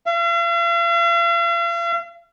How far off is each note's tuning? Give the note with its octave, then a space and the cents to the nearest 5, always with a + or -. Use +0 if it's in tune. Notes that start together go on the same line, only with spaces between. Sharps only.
F5 -45